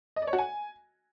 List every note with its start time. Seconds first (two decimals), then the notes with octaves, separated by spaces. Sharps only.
0.16 D#5
0.22 D5
0.27 C#5
0.33 F#4
0.38 G#5